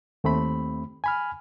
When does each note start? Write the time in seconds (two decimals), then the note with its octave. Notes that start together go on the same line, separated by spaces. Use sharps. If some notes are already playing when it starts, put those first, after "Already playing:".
0.24 D#2 A3 C4 B5
1.04 G#5 B5 F6